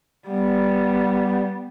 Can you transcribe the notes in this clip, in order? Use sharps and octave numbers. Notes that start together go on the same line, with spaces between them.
G3 B3